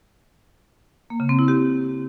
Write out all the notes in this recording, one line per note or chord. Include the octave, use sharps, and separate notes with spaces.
A#3
C#3
C4
E4
G4